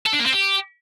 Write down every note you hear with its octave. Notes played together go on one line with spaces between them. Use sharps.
A4
D4
A#3
C4
G4